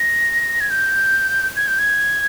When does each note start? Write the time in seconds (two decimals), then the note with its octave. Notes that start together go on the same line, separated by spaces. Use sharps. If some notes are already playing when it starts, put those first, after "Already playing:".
Already playing: A#6
0.61 G#6
0.70 G6
1.56 G#6
1.68 G6
1.79 G#6